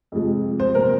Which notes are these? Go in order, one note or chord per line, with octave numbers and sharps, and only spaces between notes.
F2 C3 F3 G#3
C5
C2 A#2 F#3 A#4